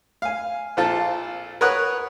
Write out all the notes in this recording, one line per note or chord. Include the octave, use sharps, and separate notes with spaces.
F5 G#5
A#1 C4 F4 A4 A5
A#4 B4 C#5 F#5 D#6 F#6